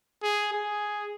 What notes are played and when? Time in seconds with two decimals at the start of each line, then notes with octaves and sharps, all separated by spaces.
0.23 G#4
0.53 G#4